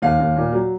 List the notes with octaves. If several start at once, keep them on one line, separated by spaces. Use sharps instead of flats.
D#2 F5
D#2
A#2
F#3